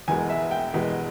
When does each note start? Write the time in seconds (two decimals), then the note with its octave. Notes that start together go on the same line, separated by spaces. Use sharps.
0.08 E1 E2 B2 G#3 G#5
0.29 E5
0.51 G5
0.73 E1 E2 B2 G#3